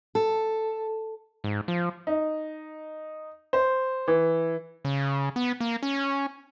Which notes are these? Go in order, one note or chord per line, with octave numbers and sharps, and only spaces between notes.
A4
G#2
F3
D#4
C5
E3
C#3
B3
A#3
C#4